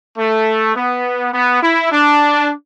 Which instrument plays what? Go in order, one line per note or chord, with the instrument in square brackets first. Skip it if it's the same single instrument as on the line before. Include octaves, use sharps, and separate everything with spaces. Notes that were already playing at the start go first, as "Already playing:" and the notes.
[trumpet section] A3
B3
B3
E4
D4